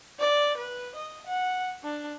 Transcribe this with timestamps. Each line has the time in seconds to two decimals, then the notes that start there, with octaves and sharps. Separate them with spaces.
0.19 D5
0.57 B4
0.95 D#5
1.27 F#5
1.83 D4